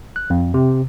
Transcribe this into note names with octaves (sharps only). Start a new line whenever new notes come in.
F#6
F2
C3